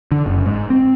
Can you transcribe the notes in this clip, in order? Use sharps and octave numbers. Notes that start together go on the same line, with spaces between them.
D3
F#1
G#2
C4